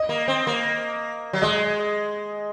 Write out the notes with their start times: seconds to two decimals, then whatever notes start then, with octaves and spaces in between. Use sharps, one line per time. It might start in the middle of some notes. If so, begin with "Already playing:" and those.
Already playing: D#5
0.09 A#3
0.28 C4
0.47 A#3
1.33 F#3
1.42 G#3 D#5